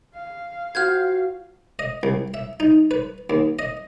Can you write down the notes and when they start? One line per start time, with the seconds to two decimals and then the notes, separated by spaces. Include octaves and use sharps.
0.14 F5
0.75 F4 F#4 C5 F6 G6 G#6
1.79 D#5
2.03 C2
2.34 E5
2.60 D#4
2.91 B4
3.30 D#2
3.59 D#5